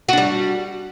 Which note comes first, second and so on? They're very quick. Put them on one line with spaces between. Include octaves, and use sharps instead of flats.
F#4 D4 G3